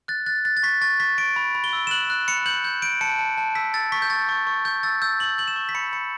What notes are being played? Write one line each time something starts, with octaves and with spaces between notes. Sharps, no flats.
F#6 A6
F#6 A6
F#6 A6
A6
C#6 B6
C#6 A6
C#6 B6
C#6 D7
B5
B5
G7
E6
E7
F#6 F#7
F#6
B5 C#7
G6 F#7
G6
G6 D7
A5 C#7
A5
A5
E6 B6
E6 A6
C#6 B6
G6
C#6 A6
C#6
C#6
C#6 G6
E6 A6
E6 G6
G6 F#7
G6 F#7
E7
C#6
B6
B5 C#7
B5 C#7